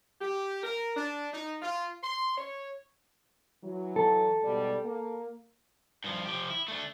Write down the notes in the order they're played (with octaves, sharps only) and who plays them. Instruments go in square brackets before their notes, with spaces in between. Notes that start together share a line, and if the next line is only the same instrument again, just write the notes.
[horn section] G4
A#4
D4
D#4
F4
C6
C#5
[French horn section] E3 F#3
[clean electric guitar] A4
[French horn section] G#2 B2 G3
A#3
[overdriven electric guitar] G2 F3
F3 G4
E4
A3 D4